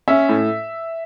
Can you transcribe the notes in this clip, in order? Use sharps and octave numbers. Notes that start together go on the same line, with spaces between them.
C#4 E5
A2